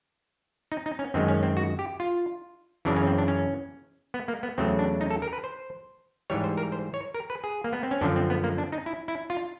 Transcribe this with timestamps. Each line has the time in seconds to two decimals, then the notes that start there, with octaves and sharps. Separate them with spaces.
0.72 D#4
0.86 D#4
0.99 C#4
1.14 F#2 D#3 G#3 C4
1.28 C#4
1.43 C4
1.57 F#4
1.79 G4
2.00 F4
2.85 F#2 C#3 E3 D4
2.96 C#4
3.07 C4
3.18 D4
3.28 C#4
4.14 B3
4.28 A#3
4.43 B3
4.58 E2 C#3 F#3 A3 C4
4.79 D4
5.01 D#4
5.11 A4
5.22 A#4
5.33 B4
5.44 C5
6.30 G#2 E3 G3 C#5
6.44 C5
6.57 A#4
6.72 C5
6.94 C#5
7.15 A#4
7.30 B4
7.44 G#4
7.64 A#3
7.73 B3
7.83 C4
7.91 C#4
8.01 F#2 D3 F3 D4
8.16 C4
8.30 B3
8.44 A#3
8.58 D4
8.72 D#4
8.86 E4
9.08 E4
9.30 F4